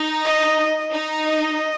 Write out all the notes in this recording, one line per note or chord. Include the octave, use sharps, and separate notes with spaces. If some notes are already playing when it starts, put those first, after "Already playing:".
Already playing: D#4
D#5
D#4
D#5